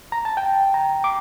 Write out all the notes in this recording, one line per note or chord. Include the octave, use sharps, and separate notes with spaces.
A#5
A5
G5
A#5
D6